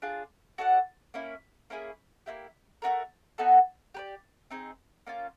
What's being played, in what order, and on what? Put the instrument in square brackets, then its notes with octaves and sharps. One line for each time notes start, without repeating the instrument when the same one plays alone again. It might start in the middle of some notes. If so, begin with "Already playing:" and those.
[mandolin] D4 F4 G#4
F#4 A4 D5 F#5
A#3 C#4 E4
A#3 C#4 E4 G#4
A#3 C#4 E4 G4
A3 D4 F#4 A#4
B3 D#4 F#4 A4
G4 B4 D5
C4 D#4 G#4
A#3 C#4 F4